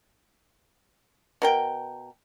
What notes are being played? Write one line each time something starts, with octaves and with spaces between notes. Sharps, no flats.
B2 A#4 G5